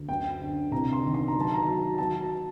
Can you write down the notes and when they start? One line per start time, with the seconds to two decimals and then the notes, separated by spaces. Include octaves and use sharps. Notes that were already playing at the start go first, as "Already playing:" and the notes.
Already playing: D2
0.08 F#2 G5
0.41 D3
0.72 C2 A#5
0.93 C6
1.04 D#3
1.14 C6
1.28 A#5
1.35 F#3
1.41 A5
1.54 A#5
1.67 F#3
1.98 F#3 A5